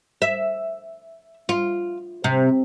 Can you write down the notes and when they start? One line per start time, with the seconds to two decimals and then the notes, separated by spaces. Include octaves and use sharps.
0.22 E5
1.49 F4
2.24 C3